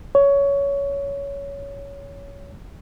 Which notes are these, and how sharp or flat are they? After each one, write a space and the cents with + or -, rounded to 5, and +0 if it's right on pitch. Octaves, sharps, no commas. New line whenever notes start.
C#5 +15